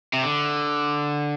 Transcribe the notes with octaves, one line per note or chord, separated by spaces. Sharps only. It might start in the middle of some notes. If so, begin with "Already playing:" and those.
C3
D3